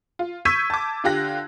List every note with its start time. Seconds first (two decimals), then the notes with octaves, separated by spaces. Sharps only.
0.19 F4
0.45 C#6 E6 G6 G#6 B6 D#7
0.70 A5 D6
1.04 D3 F4 G4 F#6 A#6